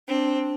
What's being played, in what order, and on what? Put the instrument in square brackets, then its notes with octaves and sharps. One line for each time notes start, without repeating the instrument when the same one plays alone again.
[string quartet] C4 [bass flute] D4